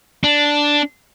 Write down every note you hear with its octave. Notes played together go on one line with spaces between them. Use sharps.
D4